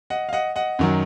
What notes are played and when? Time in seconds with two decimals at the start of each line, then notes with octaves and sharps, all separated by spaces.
0.10 D#5 F#5
0.29 F5
0.33 D#5 F#5
0.56 D#5 F#5
0.79 F#2 D#3 F#3